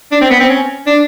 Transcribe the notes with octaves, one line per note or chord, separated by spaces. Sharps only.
D4
C4
B3
C4
C#4
D4